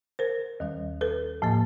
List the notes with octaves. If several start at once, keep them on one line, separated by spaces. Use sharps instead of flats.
A#4 C5
D#2 D#3 G3
A4 B4
A2 F3 A#3